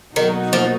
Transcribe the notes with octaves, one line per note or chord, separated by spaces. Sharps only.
B2 D#3 F#3 A#3 D#4 F#4
F3